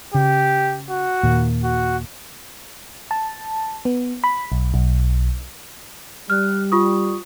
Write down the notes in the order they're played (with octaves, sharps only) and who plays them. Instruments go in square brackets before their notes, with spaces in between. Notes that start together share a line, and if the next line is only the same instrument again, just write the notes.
[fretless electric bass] C#3 [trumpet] G4
[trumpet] F#4
[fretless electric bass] D#2 A#2
[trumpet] F#4
[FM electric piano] A5
B3
B5
B1
B1
[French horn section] G3 [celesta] F6 F#6
[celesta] F4 C#6 D#6